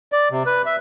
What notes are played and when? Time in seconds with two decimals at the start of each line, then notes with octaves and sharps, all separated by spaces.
0.12 D5
0.31 C3
0.46 B4
0.66 E5